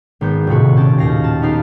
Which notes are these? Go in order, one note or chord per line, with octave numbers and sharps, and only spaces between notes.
G#1 B3 G6
D#1 A2 C3 F#4
C#4 G4 A5
D#2 F5 A#6
A5
B3 D#4 G4 F5